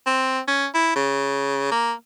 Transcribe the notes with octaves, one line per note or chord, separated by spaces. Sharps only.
C4
C#4
E4
C#3
A#3